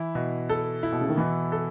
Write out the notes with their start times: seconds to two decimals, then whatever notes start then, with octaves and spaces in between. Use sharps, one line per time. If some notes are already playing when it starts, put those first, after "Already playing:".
Already playing: E3 E4
0.15 B2
0.49 A4
0.83 E4
0.92 B2
1.01 C#3
1.09 D#3
1.17 B2 E3
1.52 A4